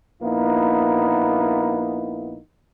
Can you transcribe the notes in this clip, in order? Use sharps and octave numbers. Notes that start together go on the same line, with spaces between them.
A#1 A#3 B3 D#4 E4